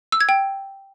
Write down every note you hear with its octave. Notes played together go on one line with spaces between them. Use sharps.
E6
G#6
G5